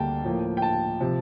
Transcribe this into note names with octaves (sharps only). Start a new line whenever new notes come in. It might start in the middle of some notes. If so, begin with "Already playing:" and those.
Already playing: D2 D3 G3 A#3 G5 A5
A2 F3 A#3
G5
A5
C3 F3